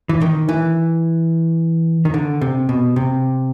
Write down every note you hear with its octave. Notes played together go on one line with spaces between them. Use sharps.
E3
D#3
E3
D#3
D3
C3
B2
C3